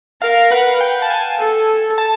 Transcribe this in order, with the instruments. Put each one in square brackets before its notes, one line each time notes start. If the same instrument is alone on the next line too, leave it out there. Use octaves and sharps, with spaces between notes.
[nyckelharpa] A#4 [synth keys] F5
[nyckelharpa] B4 [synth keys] F#5
[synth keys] G5
A5
G#5
[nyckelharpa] A4
[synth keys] A5